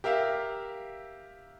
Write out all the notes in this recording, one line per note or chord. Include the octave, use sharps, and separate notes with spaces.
G4 A#4 E5 F5